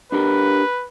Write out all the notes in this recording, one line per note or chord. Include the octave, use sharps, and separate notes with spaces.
D4 G4 A#4 B4